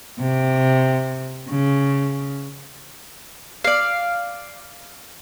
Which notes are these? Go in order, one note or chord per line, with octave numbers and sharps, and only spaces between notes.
C3
C#3
D5 F5